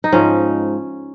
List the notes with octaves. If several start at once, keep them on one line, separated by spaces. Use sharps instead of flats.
D#4
G#2 F3 C#4